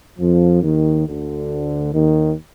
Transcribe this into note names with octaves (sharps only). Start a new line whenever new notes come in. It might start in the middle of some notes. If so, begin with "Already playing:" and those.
F2 F3
D#2 D#3
D2 D3
D#2 D#3